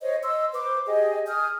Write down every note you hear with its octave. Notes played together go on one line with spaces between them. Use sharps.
C5 C#5 D#5
D#5 C6 E6
B4 C5 D6
G4 G#4 D#5
G#4 D#6 F6 G6